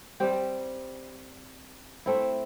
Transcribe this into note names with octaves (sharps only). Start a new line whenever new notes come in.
G3 C4 G4
A3 C4 E4